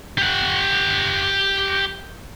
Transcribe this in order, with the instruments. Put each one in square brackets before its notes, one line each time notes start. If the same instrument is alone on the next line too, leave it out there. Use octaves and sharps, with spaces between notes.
[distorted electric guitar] G4 F#5